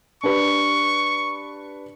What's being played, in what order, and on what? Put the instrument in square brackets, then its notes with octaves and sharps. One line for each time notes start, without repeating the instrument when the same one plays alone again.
[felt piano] D4 G4 B4 [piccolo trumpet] C#6